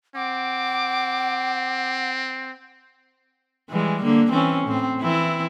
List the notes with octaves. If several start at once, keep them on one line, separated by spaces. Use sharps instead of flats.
C4 F#5 D6
E3 G3 G#3
D3 A#3
E3 C4 C#4
A2 C4
E3 C4 E4